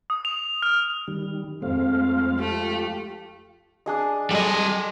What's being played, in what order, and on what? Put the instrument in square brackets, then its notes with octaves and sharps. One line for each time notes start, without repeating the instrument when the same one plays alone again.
[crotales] D#6
F7
F6
[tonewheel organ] D#3 G3
[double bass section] F2 F3 G#3 [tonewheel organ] A3 C4 F5
[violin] A3 [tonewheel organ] F4 G4
[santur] D4 G#4 D#5
[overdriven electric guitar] G3 D#5 [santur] G#4 A4